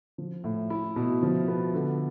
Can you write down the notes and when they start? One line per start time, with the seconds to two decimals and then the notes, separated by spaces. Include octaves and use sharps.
0.18 F3
0.44 A2
0.70 E4
0.96 B2
1.22 F3
1.48 B3
1.74 D3